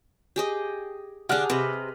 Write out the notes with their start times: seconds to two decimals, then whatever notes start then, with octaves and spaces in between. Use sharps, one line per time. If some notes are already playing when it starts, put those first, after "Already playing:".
0.36 G4 G#4 D#5
1.29 D3 D4 G4 G#4 F#5 F6 F#6
1.50 C3 B4 D#5